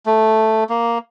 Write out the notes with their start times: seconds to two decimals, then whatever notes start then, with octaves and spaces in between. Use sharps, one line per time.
0.06 A3
0.70 A#3